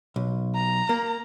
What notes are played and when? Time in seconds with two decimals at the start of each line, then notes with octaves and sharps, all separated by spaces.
0.16 B1
0.55 A#5
0.89 A#3